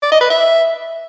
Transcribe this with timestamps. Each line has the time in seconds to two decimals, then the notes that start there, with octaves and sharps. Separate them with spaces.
0.03 D5
0.12 D#5
0.21 B4
0.30 E5